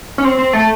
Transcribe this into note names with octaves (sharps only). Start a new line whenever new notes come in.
C#4
C4
C4
A3